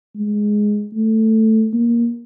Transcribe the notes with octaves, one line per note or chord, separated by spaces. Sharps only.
G#3
A3
A#3